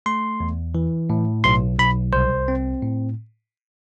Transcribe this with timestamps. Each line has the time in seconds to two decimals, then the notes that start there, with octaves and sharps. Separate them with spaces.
0.06 A3 C6
0.40 E2
0.75 E3
1.10 A2
1.44 B1 C6
1.79 B1 B5
2.13 C2 C5
2.48 C4
2.82 A2